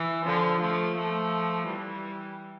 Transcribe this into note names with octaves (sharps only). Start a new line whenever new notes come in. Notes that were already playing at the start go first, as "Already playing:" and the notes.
Already playing: E3
D3 F3
F3 A3
F3 A3
E3 G3